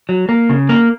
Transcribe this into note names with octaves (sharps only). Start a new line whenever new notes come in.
F#3
A#3
C#3
A#3